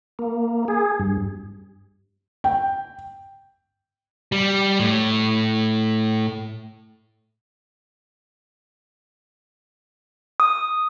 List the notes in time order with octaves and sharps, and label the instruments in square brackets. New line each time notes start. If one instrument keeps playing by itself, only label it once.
[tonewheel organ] A#3
G#4
G2
[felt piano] G5
[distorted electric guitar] G3
A2
[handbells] D#6